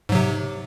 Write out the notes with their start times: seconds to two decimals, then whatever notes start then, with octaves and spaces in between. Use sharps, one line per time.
0.09 G#2
0.12 F#3
0.15 C3